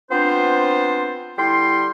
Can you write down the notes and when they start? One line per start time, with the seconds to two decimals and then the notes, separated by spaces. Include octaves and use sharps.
0.11 B3 C4 D4 F4 C5
1.39 D3 G3 E4 G5 C6